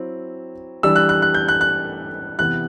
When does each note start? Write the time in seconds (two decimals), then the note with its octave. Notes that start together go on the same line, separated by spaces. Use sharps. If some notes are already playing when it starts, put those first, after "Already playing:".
Already playing: F#3 C4 E4
0.83 E3 G3 D4 E6
0.96 F#6
1.09 F#6
1.22 F#6
1.34 G6
1.48 F#6
1.61 F#6
2.39 C3 E3 B3 F#6